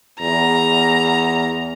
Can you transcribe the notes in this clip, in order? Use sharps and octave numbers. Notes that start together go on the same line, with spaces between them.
E2 A#5